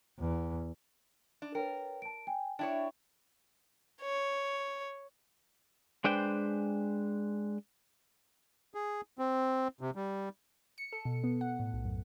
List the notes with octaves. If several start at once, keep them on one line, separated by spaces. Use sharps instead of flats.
E2
D4
A#4 B4 C#5 G5
A5 D7
G5 G#5
D4 E4 C#5 E5 G5 A5
C#5
G#3 D4 B4 C5 G5
G#4
C4
C3
G3
C#7
A4
B2
B3
F#5
A2
B1
F#2